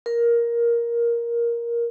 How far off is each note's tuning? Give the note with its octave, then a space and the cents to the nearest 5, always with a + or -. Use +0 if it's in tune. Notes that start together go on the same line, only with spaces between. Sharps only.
A#4 +10